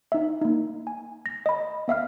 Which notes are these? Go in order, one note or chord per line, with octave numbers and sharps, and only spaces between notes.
D#4 E5
A#3 D#4
G#5
A#6
D#5 B5
B3 E5 F5 F6